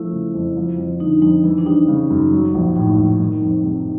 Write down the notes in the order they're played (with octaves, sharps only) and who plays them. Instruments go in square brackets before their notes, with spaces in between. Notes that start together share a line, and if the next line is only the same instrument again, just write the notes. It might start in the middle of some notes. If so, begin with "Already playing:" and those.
Already playing: [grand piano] F3 A3 [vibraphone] E4
[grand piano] C#3
F2
F3
F2
[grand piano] D3 [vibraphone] D#4
[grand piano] F2 [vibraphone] D#4
[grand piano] E3 [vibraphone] E4
[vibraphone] D4
[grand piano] G3 [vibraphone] D#4
[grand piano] C#3
F#2
F#3
A#1
[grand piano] A2 [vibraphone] D#4
[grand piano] A#1
D#3
F2
C3